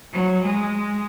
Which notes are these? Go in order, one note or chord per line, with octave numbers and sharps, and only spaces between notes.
F#3
G#3